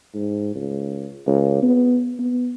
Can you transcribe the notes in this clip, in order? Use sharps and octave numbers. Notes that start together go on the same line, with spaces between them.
G#2
C#2
C#2
B3
B3